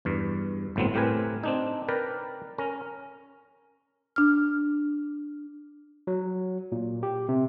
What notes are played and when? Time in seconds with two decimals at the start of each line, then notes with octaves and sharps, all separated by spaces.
0.05 E2 G2
0.76 G1 A2 F#3 B3 C4
0.94 A2 C4 G4 A#4 B4 G#5
1.43 C4 D4 D#4
1.88 A#4 B4 D5 G5
2.58 C#4 A#4
4.16 D4 F6
6.07 F#3
6.72 A#2
7.03 G4
7.29 C3